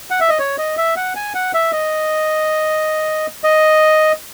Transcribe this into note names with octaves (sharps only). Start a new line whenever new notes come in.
F#5
E5
D#5
C#5
D#5
E5
F#5
G#5
F#5
E5
D#5
D#5